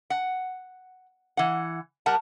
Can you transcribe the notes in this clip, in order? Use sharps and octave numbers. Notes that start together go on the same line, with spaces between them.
F#5
E3 F#5
G3 A#4 F#5 A5